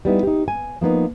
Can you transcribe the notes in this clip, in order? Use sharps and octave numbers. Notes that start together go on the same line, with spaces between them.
G3 B3 D#4 E4
D#4 G4
G#5
F3 A#3 B3 D#4